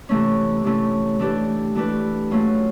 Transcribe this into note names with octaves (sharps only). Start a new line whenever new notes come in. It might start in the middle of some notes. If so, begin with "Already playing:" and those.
C3 E3 A3 C#4
C3 E3 A3 C#4
E3 A3 D4 G4 B4
E3 A3 D4 G4 B4
F#3 A3 C#4 F4